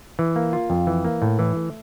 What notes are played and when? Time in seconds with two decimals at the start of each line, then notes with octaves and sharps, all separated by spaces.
0.19 E3
0.36 A#3
0.53 F4
0.70 F2
0.87 E3
1.04 A#3
1.22 A2
1.39 E3
1.56 A3